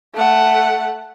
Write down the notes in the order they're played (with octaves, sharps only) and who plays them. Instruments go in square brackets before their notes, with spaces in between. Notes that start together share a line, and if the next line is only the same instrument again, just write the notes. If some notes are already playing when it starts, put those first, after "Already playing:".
[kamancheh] A3 F#5